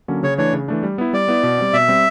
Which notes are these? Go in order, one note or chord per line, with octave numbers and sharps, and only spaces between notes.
D3 F#3 A#3 C#4
C#3 C#5
E3 A3 D4 C#5
C#3
E3 A3 D4
G3
B3 E4
G3 D5
B3 E4
B2
G3 C4
B2 E5
G3 C4